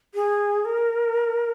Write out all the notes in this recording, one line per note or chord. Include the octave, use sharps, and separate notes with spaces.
G#4
A#4